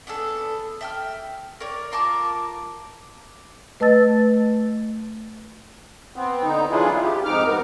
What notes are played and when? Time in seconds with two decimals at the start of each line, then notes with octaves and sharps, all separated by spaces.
0.07 B3 D4 G#4 A4
0.81 E5 G5 F6
1.60 A#4 C#5 D5
1.92 F4 A#4 A5 D6
3.80 A3 B4 D#5 A5 E6 A6
6.16 B3 C4
6.44 D3 D#4
6.71 E3 F#3 D4 E4 F4 G#4
7.02 G4
7.24 F2 G#2 D#4 D6 F6
7.46 G#2 B3 A#4